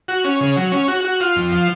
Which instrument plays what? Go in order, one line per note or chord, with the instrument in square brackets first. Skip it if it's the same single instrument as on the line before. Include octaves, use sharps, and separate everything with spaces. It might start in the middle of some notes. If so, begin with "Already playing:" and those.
[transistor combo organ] F#4
C#4
C#3
F#3
C#4
F#4
F#4
F4
F2
F3